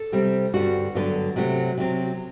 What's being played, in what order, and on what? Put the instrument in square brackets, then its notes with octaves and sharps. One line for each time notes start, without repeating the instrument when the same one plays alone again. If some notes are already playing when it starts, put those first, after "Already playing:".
Already playing: [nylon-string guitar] A4
C3 G3 C4
G2 D3 G3 F#4
G2 D3 F#3 B3
C3 F#3 A3 C4
C3 F#3 C4